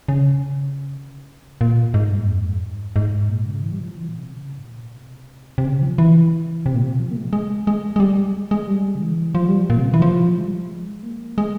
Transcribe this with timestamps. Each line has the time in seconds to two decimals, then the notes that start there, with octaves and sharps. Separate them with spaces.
0.09 C#3
1.61 A#2
1.94 G#2
2.10 G2
2.28 F2
2.61 G#2
2.96 G#2
3.29 A#2
3.46 C#3
3.63 E3
3.72 G3
3.79 F3
3.96 E3
4.09 A#2
4.19 C3
4.30 C#3
4.58 G#2
4.63 A#2
4.97 C3
5.58 C3
5.65 C#3
5.82 F3
5.98 E3
6.66 C3
6.75 A#2
6.83 C3
7.00 F3
7.11 A#3
7.16 G#3
7.33 G#3
7.67 G#3
7.96 G#3
8.00 G3
8.34 G#3
8.51 G#3
8.67 G3
8.95 C#3
9.01 E3
9.35 F3
9.49 G3
9.61 F3
9.70 A#2
9.77 C3
9.86 C#3
9.94 E3
10.02 F3
10.38 G#3
10.45 G3
10.53 F3
10.69 G#3
11.03 A#3
11.38 G#3